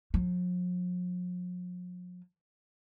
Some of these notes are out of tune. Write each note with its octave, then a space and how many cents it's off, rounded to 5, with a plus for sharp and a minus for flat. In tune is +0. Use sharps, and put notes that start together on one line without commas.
F3 +45